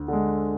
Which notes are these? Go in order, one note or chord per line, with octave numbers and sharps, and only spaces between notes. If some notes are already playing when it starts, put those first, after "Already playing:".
Already playing: D2
D3 G#3